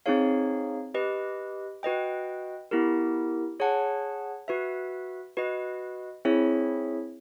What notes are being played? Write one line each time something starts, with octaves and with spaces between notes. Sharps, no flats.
C4 D#4 G#4 C#5 F5
G4 B4 D#5
F#4 B4 D#5 G5
B3 E4 G4 A#4
G#4 C#5 F#5 A5
F#4 B4 E5
F#4 B4 D#5
C4 E4 G#4 C#5 E5